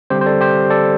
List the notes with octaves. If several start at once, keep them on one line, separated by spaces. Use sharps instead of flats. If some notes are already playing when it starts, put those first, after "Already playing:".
D3 G3 C4 G4 C5
C5
A4 D5
G4 C5
A4 D5